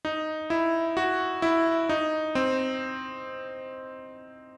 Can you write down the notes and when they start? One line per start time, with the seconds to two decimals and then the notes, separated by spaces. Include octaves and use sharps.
0.05 D#4
0.50 E4
0.97 F#4
1.42 E4
1.89 D#4
2.35 C4